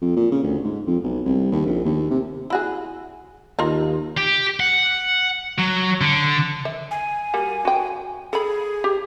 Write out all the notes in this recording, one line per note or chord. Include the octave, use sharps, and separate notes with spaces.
F2
A#2
C#3
D2
G#2
F2
B1
C2
D#2
A#1
D#2
C3
E4 F#4 G#4
D#2 F4 A#4 D#5
G4
F#5
F#3
D3
E5
G#5
G3 A#3 F#4
F#4 G5
G#4 A4 B5
G4